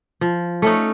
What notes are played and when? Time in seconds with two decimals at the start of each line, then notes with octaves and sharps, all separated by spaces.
0.21 F3
0.62 A3 C#4 D#4